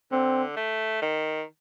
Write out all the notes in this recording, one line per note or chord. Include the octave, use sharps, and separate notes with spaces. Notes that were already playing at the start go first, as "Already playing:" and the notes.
D3 C4
A3
D#3